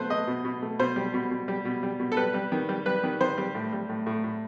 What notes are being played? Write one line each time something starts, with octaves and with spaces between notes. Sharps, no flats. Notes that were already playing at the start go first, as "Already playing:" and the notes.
Already playing: B2 A3 B4 C5
A3 D#5
B2
B2
A3
B2 C5
G3
B2
B2
G3
B2
G3
B2
A4
G3 B4
G3
D#3
G3
G3 B4
D#3
D#3 C5
G3
A2
G3
A2
A2
A2